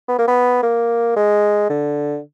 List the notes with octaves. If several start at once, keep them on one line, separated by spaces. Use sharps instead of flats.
B3
A#3
B3
A#3
G#3
D3